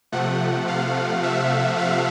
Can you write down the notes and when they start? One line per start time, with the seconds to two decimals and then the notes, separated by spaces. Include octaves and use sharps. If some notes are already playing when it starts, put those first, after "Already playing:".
0.12 C3 F3 A3 F#5
0.68 F5
1.23 E5
1.79 F5